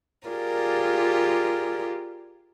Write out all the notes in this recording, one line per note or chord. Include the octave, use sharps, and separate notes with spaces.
F4 G4 G#4 A#4 D5